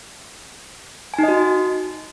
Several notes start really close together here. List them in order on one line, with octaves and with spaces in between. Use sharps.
G#5 D#4 D#5 F#4